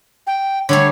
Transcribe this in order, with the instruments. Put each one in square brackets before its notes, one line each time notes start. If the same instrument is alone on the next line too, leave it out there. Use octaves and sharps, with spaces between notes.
[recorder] G5
[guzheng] D3 G3 A3 [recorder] C#5